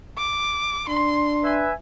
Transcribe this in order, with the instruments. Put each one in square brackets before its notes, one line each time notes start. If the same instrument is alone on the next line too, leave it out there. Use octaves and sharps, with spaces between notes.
[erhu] D6
[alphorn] D4 [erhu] C6
[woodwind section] B4 E5 G#5